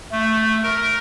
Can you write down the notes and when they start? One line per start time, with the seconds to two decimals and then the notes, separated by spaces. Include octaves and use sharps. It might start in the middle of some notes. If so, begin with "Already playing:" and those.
0.12 A3
0.63 A#4